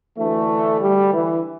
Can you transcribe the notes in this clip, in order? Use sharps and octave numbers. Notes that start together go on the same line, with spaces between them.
D2 D3 E3 A3
G3
E3